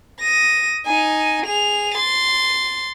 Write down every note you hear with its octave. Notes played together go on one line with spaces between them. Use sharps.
D#6 A#6
D#4 G#5
G#4 F7
C6 A6